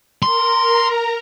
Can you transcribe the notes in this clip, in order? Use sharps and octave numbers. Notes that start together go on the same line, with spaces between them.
A#4 A#5 C6